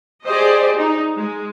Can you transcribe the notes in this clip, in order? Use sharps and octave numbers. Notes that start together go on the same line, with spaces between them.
G4 G#4 C5 D5 D#5
D#4
G#3